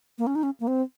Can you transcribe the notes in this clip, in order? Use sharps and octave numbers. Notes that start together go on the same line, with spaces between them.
A#3
C#4
D#4
C#4
A#3
C4